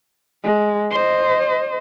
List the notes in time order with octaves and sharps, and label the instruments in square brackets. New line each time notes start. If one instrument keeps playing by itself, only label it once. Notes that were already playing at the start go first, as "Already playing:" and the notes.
[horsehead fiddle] G#3
C5 D#5